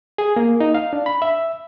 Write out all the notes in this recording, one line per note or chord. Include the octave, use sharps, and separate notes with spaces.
G#4
A#3
D#4
F5
D4
B5
E5